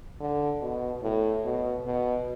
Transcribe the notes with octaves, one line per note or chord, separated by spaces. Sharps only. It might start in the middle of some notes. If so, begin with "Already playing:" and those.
D3
B2
A2
B2
B2